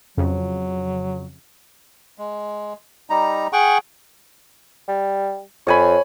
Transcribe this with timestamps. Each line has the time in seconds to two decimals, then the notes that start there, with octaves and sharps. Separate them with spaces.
0.17 F2 C#3 F#3
2.18 G#3
3.10 G3 D#4 A#5
3.53 G#4 F#5 G5 C#6
4.88 G3
5.67 F2 C#5 G#5 B5